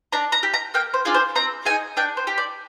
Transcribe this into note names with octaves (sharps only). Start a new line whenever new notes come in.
D4 A#5
A#5
G4
A#5
A#3 G5
C5
D4 F4 G#4
C5
C4 A#5
D#4 G#4 G#5
D4 G5
C5
G4
D5